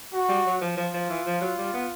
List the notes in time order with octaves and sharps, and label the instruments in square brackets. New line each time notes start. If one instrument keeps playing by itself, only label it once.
[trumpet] F#4
[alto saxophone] G3
F#3
F3
[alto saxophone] F3 [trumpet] F4
[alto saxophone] F3
E3
F3
F#3
G3
B3